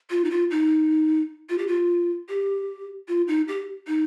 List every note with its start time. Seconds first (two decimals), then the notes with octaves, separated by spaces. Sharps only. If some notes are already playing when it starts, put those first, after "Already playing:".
0.11 F4
0.24 D#4
0.30 F4
0.51 D#4
1.50 F4
1.58 G4
1.67 F4
2.29 G4
3.08 F4
3.28 D#4
3.48 G4
3.87 D#4